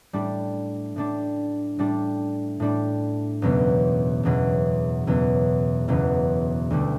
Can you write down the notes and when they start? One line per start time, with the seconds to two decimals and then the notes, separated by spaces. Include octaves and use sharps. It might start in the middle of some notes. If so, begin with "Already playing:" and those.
0.13 A2 G3 D4
0.96 A2 G3 D4
1.79 A2 G3 D4
2.60 A2 G3 D4
3.42 F#1 E2 B2 F#3 B3
4.23 F#1 E2 B2 F#3 B3
5.07 F#1 E2 B2 F#3 B3
5.88 F#1 E2 B2 F#3 B3
6.70 D2 D3 G3